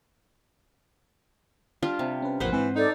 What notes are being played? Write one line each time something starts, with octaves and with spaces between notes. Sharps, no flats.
G3 D4 F4
C3
C#4 B4
A1 F2 A#2 B4 C5 F#5
G#2 E3 C4
D#4 A4 D5